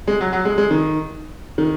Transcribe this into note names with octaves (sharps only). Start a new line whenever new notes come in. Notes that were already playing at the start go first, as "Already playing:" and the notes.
G#3
F#3
F#3
G#3
G#3
D#3
D#3